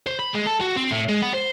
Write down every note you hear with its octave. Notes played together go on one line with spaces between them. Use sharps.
C5
B5
G#3
A4
F#4
C4
A2
G#3
B3
C5